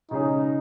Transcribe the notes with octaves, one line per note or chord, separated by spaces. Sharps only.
C#3 G#3 C#4 D#4 G#4